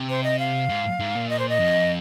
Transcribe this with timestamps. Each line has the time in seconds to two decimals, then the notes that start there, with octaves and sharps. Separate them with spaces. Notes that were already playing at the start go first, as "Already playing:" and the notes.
Already playing: C3
0.09 C5
0.23 D#5
0.39 F5
0.70 G#2
1.00 G#2
1.15 A#2
1.29 D#5
1.39 C5
1.49 D#5
1.59 F2